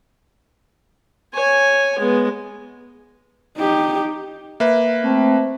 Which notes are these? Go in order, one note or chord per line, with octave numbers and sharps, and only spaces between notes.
C#5 G#5
G#3 B3
D#4 G4
A#3 B4 E5
A3 C4